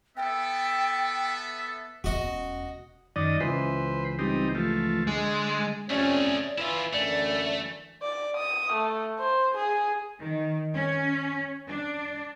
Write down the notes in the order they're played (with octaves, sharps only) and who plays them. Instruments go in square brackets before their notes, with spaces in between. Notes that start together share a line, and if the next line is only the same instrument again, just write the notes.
[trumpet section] B3 A4 E5 [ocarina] G5
[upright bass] E1 C#4 [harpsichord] F#4 D#5
[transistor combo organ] F#2 D#3 D#5 [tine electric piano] D5
[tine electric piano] C#2 E3 [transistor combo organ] B4 C5
[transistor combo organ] G3 C4 D#4
F3 A3
[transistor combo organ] D3 [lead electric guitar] G#3
[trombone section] F2 C3 C#4 [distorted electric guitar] A3 G#4 [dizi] D5
[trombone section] E3 [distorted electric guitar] E4 F4
[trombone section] F#2 D3 E3 [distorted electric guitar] A3 [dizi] D5
[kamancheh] D5
D#6
A3
C5
G#4
[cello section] D#3
C#4
D4